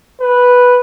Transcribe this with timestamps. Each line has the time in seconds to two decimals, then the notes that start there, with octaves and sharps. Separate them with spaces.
0.21 B4